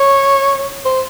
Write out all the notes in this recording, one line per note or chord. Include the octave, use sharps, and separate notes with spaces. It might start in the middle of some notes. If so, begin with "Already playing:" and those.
Already playing: C#5
C5